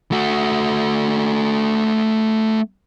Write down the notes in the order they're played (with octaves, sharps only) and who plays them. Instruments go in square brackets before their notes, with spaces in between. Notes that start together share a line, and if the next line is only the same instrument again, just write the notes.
[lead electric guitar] A3 F#4